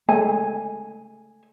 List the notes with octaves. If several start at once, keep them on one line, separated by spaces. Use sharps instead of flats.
G#3 A3 G#5